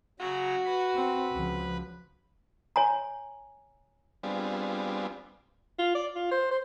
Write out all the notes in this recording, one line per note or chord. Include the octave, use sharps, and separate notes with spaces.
C#3 F#3 F#4 A#5
B4 B5
C4
C#2 F3
C#5 G#5 A#5
G3 B3 C4 D4 F4 G#4
F4
D5
F4
C5
C5